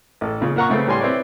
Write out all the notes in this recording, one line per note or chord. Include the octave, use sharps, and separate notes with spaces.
A1 A4
A#2 C#3 F4
A#2 A#4 F#5 A#5 C#6
C#3 A3 C4 B4
A2 G3 C#4 G#5 C6
C4 E4 B4 C#5 D5